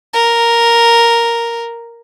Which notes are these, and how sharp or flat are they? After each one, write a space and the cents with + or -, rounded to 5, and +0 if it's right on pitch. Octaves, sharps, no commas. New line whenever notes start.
A#4 +0